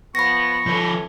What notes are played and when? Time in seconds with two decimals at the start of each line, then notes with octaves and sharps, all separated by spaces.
0.15 F3 B3 B5 C#6 A#6
0.66 A2 F3 C#4 A4 B4